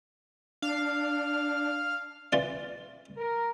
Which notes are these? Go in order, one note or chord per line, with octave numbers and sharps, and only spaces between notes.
D4 F5
E3 F4 D5
A#4